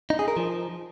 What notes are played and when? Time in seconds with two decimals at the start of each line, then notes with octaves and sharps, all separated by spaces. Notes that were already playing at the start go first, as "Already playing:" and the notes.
0.10 D#4
0.19 G#4
0.28 A#4
0.37 F3